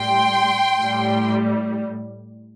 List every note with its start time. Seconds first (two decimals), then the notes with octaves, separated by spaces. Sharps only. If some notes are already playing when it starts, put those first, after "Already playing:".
Already playing: A2 G3 G5 C6
0.78 A2 G3